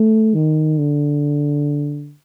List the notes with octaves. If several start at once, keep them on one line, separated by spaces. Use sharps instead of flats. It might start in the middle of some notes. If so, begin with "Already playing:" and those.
Already playing: A3
D#3
D3